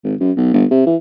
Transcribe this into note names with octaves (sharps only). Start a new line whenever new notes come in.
G#1
F#2
B1
G1
C3
E3